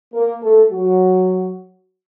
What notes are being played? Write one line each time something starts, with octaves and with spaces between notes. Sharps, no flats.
A#3 A#4
A3 A4
F#3 F#4